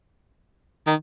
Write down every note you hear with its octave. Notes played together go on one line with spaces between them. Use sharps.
D#3